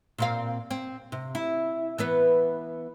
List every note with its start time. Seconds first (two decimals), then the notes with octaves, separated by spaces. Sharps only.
0.18 A#2 C4 F5
0.71 C4
1.12 C3
1.35 E4
1.98 E3 B3 B4